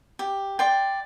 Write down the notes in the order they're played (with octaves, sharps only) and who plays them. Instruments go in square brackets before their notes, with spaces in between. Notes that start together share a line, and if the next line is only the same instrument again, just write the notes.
[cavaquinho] G4
D5 G5 C6